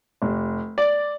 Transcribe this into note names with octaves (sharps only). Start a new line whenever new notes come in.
F1
D5